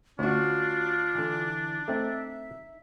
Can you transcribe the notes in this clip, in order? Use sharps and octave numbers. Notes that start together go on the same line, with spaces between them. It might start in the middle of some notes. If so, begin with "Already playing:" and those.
D2 C#4 D4 F4 F#4
D3 E3
A3 C4 D#4 E5